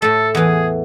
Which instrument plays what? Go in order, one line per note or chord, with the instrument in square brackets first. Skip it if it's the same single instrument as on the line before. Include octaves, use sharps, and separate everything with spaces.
[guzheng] A2 A3 [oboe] A4
[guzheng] E2 E3 [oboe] G#4